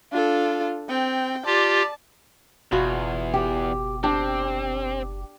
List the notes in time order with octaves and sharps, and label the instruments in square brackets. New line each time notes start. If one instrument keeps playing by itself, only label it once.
[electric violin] D4 A4 [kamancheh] F4
[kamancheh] C4 [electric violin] G5
[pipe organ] F4 G4 [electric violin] D5 [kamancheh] A5
[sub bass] F#1 [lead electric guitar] E2 [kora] B2 F4 F#4
[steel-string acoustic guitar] G4
[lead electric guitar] C4 [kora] D4 [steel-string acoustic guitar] G4